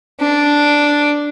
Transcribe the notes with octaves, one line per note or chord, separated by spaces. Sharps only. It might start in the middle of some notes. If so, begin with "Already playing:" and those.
D4